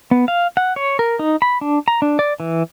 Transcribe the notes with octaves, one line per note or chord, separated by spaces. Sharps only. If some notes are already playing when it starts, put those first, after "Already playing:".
B3
F5
F#5
C#5
A#4
D#4
B5
D4
A#5
D4
D5
E3